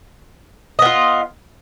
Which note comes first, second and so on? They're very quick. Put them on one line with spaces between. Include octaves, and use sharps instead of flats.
D#5 B3 F4